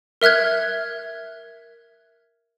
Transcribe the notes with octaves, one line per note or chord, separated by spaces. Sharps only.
A#4 E5 F6 F#6 G#6